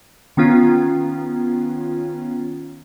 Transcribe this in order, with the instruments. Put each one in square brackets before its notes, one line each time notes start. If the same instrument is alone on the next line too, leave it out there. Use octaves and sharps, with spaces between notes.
[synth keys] D#3 B3 C#4 F4